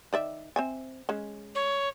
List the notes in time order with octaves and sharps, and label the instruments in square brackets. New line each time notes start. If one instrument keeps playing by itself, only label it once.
[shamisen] D#3 D5 E5
C4 E5 G#5
G#3 C#4
[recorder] C#5